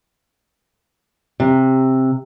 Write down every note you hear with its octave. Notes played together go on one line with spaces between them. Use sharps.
C3